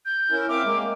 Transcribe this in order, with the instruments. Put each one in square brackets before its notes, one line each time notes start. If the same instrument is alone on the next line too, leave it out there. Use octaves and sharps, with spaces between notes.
[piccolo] G6
[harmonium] C#4 E4 A#4
[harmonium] C4 E5 F5 [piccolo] D6
[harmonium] G#3 A#3